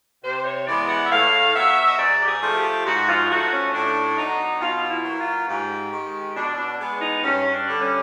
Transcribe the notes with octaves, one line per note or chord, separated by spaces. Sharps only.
C3 C5
C#5
E3 G#3 B3 D5
F#5
E5
A2 F5
F#3 B3 E5
D#5
G#2 D5
G4
G#4
F3 A3
G4
G#2 F#4
F4
F3 A3 F#4
C#4
A2 D4
F#3 B3 D#4
B2 F4
E4
F#3 A#3
F4
G#2 G4
D#3 G#3
B2 D4
D4
G#3 B3
D#4
G2 C#4
D4
D3 G3
C#4